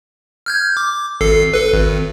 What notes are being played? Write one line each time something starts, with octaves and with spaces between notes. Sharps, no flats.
F6 G6 G#6
D6
G#1 A4 C7
A4 B4
G#1